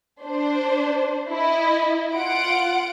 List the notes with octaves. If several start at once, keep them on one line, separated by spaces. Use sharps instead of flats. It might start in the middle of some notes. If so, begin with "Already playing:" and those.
D4 C5
E4 D#5
F4 F#5 D7